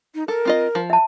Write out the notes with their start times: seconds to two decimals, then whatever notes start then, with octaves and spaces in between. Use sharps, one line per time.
0.15 D#4
0.28 A4 A#4
0.45 C4 F4 D#5
0.75 F3
0.90 E5 A5